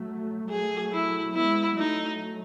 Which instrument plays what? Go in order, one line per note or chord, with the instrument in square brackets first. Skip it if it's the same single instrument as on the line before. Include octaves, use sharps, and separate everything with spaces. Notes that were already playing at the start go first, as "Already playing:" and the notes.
Already playing: [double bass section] F#3 A3
[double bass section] F#3 A3 [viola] G#4
[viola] E4
[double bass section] G#3 B3 [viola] E4
[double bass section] F#3 A3 [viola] D#4